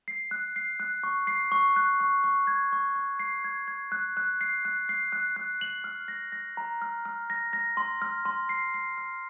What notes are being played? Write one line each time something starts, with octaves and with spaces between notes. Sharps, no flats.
C7
F#6
C7
F#6
C#6
C7
C#6
F#6
C#6
C#6
G#6
C#6
C#6
C7
G#6
G#6
F#6
F#6
C7
F#6
C7
F#6
F#6
F#7
F6
A#6
A#6
A#5
F6
F6
A#6
A#6
C6
F6
C6
C7
C7
F6